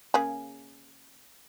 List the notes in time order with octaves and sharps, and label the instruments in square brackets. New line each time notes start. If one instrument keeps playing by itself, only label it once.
[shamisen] C#3 A#3 G#4